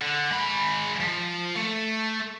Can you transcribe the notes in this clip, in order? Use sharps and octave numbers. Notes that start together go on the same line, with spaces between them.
D3
G#3 B5
F3
A3